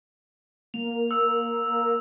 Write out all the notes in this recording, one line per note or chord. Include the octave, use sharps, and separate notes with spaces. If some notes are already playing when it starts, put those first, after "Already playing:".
A#3 F7
E6